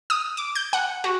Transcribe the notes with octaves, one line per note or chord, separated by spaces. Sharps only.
D#6
D6
G6
F#5
F#4